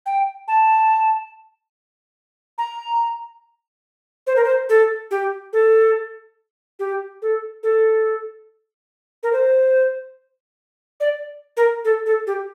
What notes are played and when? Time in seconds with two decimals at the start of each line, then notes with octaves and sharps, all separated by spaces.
0.06 G5
0.48 A5
2.58 A#5
4.27 C5
4.36 A#4
4.44 C5
4.69 A4
5.11 G4
5.53 A4
6.79 G4
7.22 A4
7.63 A4
9.23 A#4
9.33 C5
11.00 D5
11.57 A#4
11.85 A4
12.06 A4
12.27 G4